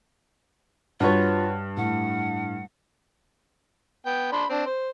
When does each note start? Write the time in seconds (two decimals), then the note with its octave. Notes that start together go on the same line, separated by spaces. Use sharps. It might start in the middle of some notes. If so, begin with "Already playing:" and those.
1.00 G2 F4 F#4 B4 C#5
1.77 A2 F#5
4.06 B3 G5
4.32 D4 B5 C6
4.49 C4 D4
4.66 C5